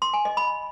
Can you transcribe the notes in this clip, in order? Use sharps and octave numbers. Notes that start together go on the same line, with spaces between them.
C6
G#5
D#5
B5